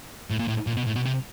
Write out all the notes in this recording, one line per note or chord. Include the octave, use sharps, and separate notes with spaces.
A2
A#2
A2
A#2
B2
A2
B2
C3